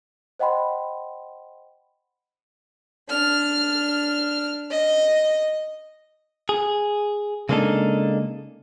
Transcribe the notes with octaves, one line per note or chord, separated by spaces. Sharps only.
C5 D#5 F#5 G5 B5 C6
D4 F6
D#5
G#4
C#3 G#3 A#3 D4 D#4 A4